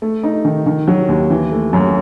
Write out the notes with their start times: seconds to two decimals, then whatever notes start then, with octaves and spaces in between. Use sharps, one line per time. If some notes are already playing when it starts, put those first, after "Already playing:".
0.02 A3
0.24 D#4
0.45 D#3
0.66 D#3
0.88 F#3
1.09 D#2
1.30 E3
1.52 A3
1.73 F#2